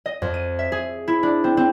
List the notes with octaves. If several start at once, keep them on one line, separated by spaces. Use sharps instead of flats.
D#5
F2
D#7
E5
G#4
E4
D4
C4
C4